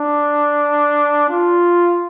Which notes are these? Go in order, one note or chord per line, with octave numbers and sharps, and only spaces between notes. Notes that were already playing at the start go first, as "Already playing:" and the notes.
Already playing: D4
F4